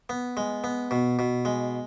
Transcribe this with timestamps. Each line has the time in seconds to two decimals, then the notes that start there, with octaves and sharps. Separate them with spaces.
0.09 B3
0.37 G#3
0.64 B3
0.91 B2
1.19 B2
1.45 G#3